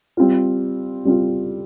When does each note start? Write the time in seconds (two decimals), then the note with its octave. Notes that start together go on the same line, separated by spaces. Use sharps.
0.17 G3 C4 F4
1.05 G3 C4 F4